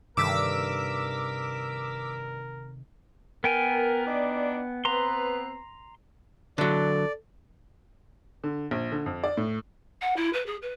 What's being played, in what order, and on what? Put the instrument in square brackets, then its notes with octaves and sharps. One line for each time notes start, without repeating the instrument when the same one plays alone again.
[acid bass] G2 [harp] C3 D#3 A3 [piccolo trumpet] A#4 [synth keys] D6 E6 B6
[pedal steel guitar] B3 G5 G#5 [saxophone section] A#4
[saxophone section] D4 D#4 D5
[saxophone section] B3 C4 B4 [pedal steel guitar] A#5 C6
[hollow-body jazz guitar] D3 F#3 [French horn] A4 [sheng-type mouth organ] D5
[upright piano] D3
A#1
D3
F2
D5
A2
[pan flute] F#5
E4
B4
G#4
B4